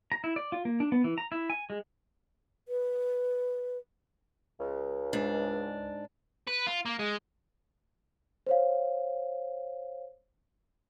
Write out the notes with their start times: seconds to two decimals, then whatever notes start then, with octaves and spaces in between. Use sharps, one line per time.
0.12 A#5
0.24 E4
0.36 D5
0.52 F4
0.65 A#3
0.80 D4
0.92 B3
1.04 E3
1.18 A#5
1.32 E4
1.50 G#5
1.70 G#3
2.68 B4
4.60 C#2
5.13 G#2 D4
6.47 B4
6.67 F4
6.86 A#3
6.99 G#3
8.47 C5 C#5 F5